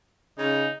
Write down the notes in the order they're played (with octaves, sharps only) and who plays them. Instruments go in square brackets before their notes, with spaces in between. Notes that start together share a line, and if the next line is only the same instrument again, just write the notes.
[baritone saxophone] C#3 [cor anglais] D#4